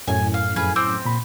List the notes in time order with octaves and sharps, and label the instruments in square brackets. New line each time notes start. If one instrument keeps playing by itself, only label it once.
[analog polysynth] F#2 A2 [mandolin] G#5
[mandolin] F5
[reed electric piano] F2 [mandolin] G#4 B4 F5
[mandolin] C4 [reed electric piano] D6 E6 G6
[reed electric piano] A#2 B5